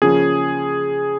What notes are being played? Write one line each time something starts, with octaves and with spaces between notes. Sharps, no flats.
C#3 F3 A#3 C#4 G#4